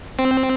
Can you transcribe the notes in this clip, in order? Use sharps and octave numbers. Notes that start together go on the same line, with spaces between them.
C4